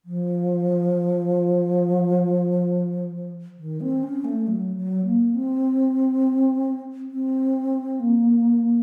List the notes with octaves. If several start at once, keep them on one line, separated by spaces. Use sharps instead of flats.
F3
D#3
C4
C#4
A3
F#3
F#3
A#3
C4
C4
A#3